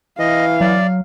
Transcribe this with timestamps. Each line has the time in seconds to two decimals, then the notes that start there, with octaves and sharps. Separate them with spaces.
0.19 E3 D#5 F5
0.61 F#3 D5